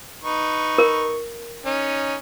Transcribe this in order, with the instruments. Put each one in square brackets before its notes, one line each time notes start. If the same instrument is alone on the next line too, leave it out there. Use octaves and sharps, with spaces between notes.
[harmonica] D#4 B4 C#6
[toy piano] A#4
[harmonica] C#4 D#4